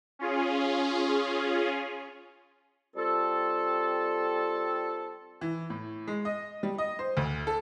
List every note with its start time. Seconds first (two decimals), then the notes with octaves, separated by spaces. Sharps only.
0.19 C#4 F4 G#4
2.95 G3 C4 F4 A4
5.41 E3
5.70 A2
6.08 G#3
6.25 D#5
6.63 G3
6.78 D#5
6.99 C5
7.17 D2
7.47 A4